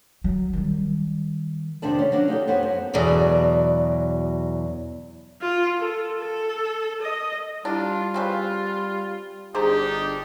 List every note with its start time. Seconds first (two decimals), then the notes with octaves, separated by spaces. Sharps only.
0.24 F#3
0.53 D#3 G3
1.82 F2 C3 D#3 D4 D5 A5
1.99 C#4
2.12 F#3 A#3 D4
2.28 D#4 G4 A4
2.47 F2 B3 C5 C#5
2.63 F#2
2.94 E2 B2 F#3 D5
5.41 F4
5.78 A4
6.21 A4
7.02 D#5
7.65 G3 D4 E4 F4
8.14 C#3 C4 B4
9.55 G1 D4 D#4 G4 G#4 C5 A#5